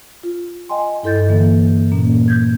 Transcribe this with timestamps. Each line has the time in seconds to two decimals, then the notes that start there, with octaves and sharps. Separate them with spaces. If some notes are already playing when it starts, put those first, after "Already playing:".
0.23 F4
0.69 D#5 G5 G#5 C6
1.03 G2 E4 A4 D#5 G6 A6
1.28 D3 E3 A#3
1.92 A#2 A#3 C#4
2.28 G6 G#6